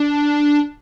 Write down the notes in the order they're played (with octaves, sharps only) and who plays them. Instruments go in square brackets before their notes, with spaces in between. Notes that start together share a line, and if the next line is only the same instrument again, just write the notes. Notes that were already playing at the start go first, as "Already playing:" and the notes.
Already playing: [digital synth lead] D4